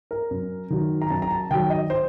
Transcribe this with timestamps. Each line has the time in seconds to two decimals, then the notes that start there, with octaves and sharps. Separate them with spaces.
0.11 A#4
0.31 F#2
0.70 D#3 F#3
1.02 A#5
1.10 F#2 A5
1.22 A#5
1.31 A5
1.51 D#3 F#3 G5
1.70 D#5
1.90 C5